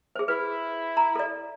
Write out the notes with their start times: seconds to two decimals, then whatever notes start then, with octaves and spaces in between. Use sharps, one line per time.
0.15 G#4 C5
0.28 E4 B4
0.97 A#5
1.15 A4 D5